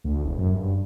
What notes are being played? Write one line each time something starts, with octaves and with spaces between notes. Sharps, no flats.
D2
E1
F#2
G2